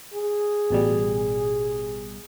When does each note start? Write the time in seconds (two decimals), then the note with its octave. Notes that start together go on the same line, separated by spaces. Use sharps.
0.14 G#4
0.70 A1 B2 G3